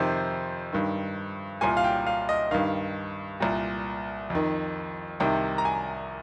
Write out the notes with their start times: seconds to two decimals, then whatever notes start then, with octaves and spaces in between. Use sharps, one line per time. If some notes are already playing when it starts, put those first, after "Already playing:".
Already playing: F2 C3 D#3 C5
0.73 G2 D#3
1.61 C2 A#2 G#5
1.77 F5
1.84 G5
2.07 F5
2.29 D#5
2.51 G2 D#3 F5
3.40 C2 A#2
4.30 F2 D#3
5.20 C2 C3 D#3 G5
5.58 A#5
5.65 G#5